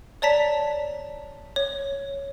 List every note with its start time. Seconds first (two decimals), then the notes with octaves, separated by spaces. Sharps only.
0.22 C#5 D5 A5 A#5 B6
1.56 C#5